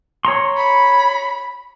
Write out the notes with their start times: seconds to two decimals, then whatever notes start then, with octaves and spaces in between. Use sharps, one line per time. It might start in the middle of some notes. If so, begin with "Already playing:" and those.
0.25 C#5 A#5 C6
0.57 B5